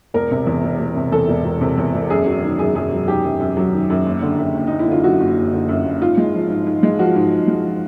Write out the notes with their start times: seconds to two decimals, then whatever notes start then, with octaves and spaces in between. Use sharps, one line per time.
0.14 E1 A#4
0.31 C3
0.47 E2
0.63 E1
0.80 E1
0.96 C3
1.12 E2 A4
1.29 E1
1.45 E1
1.61 C3
1.78 E2
1.94 E1
2.10 F#2 G#4
2.26 F#3
2.43 D#3
2.59 F#2 G#4
2.75 F#2 G#4
2.91 F#3
3.08 D#3 G4
3.24 F#2
3.40 F#2
3.57 F#3
3.73 D#3
3.90 F#2
4.06 F#1
4.22 D3
4.38 F#2
4.54 F#1
4.67 F#1 D#4
4.79 E4
4.88 D3 F4
5.04 F#2 F#4
5.20 F#1
5.36 F#1
5.53 D3
5.69 F#2
5.85 F#1
6.01 G#2 F4
6.18 G#3
6.34 F3
6.50 G#2
6.67 G#2
6.83 G#3
6.99 F3 F#4
7.16 G#2
7.32 G#2
7.48 G#3
7.64 F3